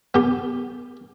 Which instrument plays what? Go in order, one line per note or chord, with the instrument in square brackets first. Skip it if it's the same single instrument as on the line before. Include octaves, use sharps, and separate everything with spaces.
[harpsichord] B3 G4